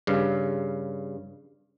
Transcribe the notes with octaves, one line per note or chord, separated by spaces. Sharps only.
G2 C#3